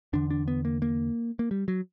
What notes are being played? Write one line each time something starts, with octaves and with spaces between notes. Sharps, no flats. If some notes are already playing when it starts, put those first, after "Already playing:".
E2 D3 D4
D4
B3
A#3
A#3
A#3
G3
F#3